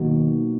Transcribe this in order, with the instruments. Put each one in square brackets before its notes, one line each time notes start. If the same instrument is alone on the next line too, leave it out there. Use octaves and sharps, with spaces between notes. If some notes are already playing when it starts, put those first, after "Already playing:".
Already playing: [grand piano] B2 F#3 A#3 D#4 F#4 [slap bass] D#3